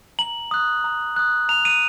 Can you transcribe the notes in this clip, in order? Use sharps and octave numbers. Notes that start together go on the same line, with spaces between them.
A#5 F#7
D#6 F#6
A#5
D#6 F#6
A#5 F7
D#7